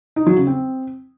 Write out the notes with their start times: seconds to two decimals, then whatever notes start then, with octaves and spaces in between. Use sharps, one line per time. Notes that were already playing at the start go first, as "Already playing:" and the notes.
0.16 D#4
0.27 F#3
0.37 C#3
0.47 C4